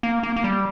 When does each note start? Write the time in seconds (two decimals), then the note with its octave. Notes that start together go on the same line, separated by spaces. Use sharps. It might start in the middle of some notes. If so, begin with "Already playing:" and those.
0.03 A#3
0.23 A#3
0.36 A#3
0.44 G3